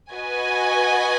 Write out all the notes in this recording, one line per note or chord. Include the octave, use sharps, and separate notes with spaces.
F#4 B4 D#5 G#5